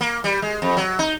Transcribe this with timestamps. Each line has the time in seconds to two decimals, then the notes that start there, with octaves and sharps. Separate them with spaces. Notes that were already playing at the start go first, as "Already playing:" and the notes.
0.01 A#3
0.24 G3
0.42 G#3
0.62 F2
0.77 F#3
0.99 D#4